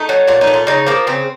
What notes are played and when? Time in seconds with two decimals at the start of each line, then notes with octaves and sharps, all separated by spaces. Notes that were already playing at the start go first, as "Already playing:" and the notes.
Already playing: A3 D#4
0.09 F#3
0.27 A#2 F4
0.41 D#4
0.47 A3
0.54 F4
0.67 C#3 D#4
0.86 F3 A#3
1.07 C#3 C4